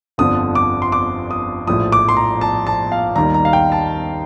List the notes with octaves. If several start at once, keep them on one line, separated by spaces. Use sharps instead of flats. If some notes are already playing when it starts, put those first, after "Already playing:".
G1 F2 D3 F3 D#6
D6
C6
D6
D#6
A#1 A2 F3 D#6
D6
C6
A#5
A5
A5
F5
D#2 D#3 G3 A#5
A#5
F5
G5
A5